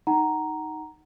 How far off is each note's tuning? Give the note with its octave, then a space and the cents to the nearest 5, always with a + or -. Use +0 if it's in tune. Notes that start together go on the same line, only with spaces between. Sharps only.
D#4 +0 F#5 +25 A#5 +0